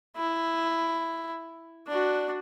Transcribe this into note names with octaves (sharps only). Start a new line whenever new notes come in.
E4
D4 F#4